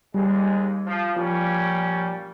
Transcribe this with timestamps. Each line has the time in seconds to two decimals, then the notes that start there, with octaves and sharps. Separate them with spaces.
0.14 D#2 G3 G#3
0.86 F3
1.16 A#2 F3 G3 C#4